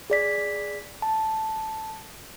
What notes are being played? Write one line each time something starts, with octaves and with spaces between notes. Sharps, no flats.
G#4 D5 B6
A5